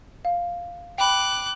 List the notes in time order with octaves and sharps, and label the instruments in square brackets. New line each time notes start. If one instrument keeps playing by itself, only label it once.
[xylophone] F5
[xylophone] G5 B5 [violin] D6 F#6